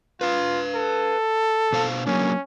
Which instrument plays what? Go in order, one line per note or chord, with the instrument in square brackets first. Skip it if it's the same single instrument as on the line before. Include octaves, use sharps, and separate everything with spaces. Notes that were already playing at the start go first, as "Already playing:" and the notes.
[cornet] F4 [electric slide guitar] B4 F5
[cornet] A4
[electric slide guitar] B2 C5 F5
[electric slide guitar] F#3 A#3 D4 [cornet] C#4